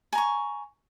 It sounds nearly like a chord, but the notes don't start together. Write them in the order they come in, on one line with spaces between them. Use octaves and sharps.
G#5 A#5 C#6